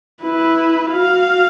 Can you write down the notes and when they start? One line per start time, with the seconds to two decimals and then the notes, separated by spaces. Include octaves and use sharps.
0.23 E4 B4
0.92 F#4 F5